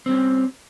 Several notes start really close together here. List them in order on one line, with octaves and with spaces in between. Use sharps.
C4 G3 C#4